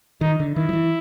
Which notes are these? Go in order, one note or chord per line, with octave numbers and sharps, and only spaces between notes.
D#3 D#4
D3
D#3 E4
F3
E3